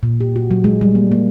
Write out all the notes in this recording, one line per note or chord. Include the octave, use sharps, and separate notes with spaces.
A#2
G4
F#4
F#3
G#3
G3
A#3
A#3